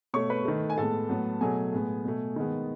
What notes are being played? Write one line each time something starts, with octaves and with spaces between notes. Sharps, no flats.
B2 A3 C#5 C#6
B4 B5
D#3 A3
G#5
A2 G#3 B3 A4 A5
A2 F#3 B3
B2 F#3 A3 G#4 G#5
A2 G#3 B3
B2 A3
D#3 G#3 B3